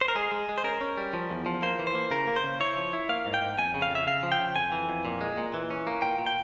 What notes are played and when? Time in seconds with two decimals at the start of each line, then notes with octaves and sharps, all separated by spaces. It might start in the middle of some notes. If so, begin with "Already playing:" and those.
0.01 C5
0.08 A#4
0.15 G#3 G#4
0.32 G#3
0.49 G#3
0.58 C5
0.64 C#4 A#4
0.81 C#4
0.98 G3
1.13 F3
1.30 E2
1.46 F3
1.62 A#3 C5
1.79 E3
1.87 C5
1.95 A#3
2.11 C#3 A#4
2.27 A#3
2.36 C5
2.44 C#3
2.60 E4 C#5
2.76 F3
2.93 E4
3.09 A#3 F5
3.26 G#2
3.34 G5
3.42 G#2
3.58 F2 G#5
3.74 C#3
3.82 F5
3.90 F2 E5
4.07 C#3 F5
4.23 F3
4.32 G5
4.40 C#3
4.56 F2 G#5
4.72 E3
4.89 F2
5.05 A#2
5.21 G#3
5.37 A#2
5.54 E3
5.70 C#4
5.87 A#3
6.02 A#2 G5
6.18 A#2
6.26 G5